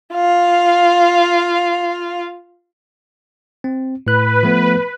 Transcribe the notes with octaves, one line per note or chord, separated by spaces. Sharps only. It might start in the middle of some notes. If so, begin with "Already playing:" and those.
F4 F5
C4
A2 B4 F#6
F3 A3 B3